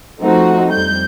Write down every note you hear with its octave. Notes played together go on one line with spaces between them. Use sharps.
F3 A3 C4 D#4 F#4
F2 G3 G6